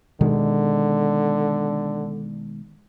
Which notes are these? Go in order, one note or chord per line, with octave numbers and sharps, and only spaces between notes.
B2 D3 D#3 G#3